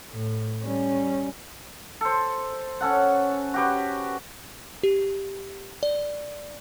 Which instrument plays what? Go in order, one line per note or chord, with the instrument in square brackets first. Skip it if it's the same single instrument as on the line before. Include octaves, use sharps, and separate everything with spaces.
[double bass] A2
G3 C#4
[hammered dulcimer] A4 C5
C#4 A4 F#5
F#4 G4 B4
[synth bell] G4
D5